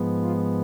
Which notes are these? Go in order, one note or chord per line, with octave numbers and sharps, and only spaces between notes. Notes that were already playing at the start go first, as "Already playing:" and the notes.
Already playing: G#2 F3 G#3 B3
F4